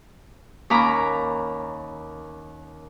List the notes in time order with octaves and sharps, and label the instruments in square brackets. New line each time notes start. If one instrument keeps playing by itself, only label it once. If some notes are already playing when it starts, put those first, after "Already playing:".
[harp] D#2 C#4 A#4 A#5 B5 D6